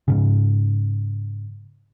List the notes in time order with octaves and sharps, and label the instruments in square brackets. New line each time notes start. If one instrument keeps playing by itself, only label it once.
[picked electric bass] G#2 C#3